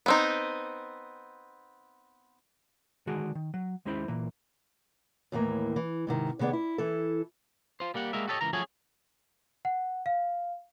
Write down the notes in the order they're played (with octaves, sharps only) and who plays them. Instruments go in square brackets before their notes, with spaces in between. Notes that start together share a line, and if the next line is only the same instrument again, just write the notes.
[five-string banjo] B3 C4 D#4
[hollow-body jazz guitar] D3 D#3 G#3 D4 F#4 G#4
D#3
F#3
D#2 G#3 C#4 E4 C5 B5
A#2 E3 A#3
[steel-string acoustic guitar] D#2 A2 E3 A#3
E3
G#2 C3 D#3
C3 D#3 B3 G#4 D5
E4
E3 E4 A4
[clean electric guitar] F4 C5
G3 A#3 G4 F#5
G3 G#3 A#3 F#4 A#4 E5
F#4 G4 A4 B4 C#5 D#5
C#2 E3 A#4 A#5
F3 F#3 A3 C#4 G#4 C#5
[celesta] F#5
F5